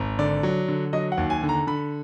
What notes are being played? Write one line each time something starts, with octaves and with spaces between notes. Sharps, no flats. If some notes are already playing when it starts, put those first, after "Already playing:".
Already playing: G#1
D3 D5
F#3
D3
F#3 D#5
F#5
D#2
G#5
D3
A#5
D3 B5